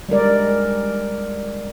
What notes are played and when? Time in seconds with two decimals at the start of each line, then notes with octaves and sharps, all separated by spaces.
0.09 G3 G#3 A#4 D5